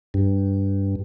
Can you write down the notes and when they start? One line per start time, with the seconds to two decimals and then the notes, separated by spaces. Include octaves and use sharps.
0.14 G2